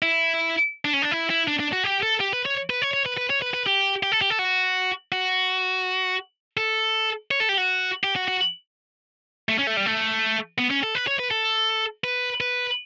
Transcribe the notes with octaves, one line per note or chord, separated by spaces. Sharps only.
E4
D4
C#4
D4
E4
E4
D4
D4
F#4
G4
A4
G4
B4
C#5
B4
C#5
C#5
B4
B4
C#5
B4
B4
G4
G4
A4
G4
A4
F#4
F#4
A4
C#5
A4
G4
F#4
G4
F#4
F#4
A3
C#4
A3
G3
A3
B3
C#4
A4
B4
C#5
B4
A4
B4
B4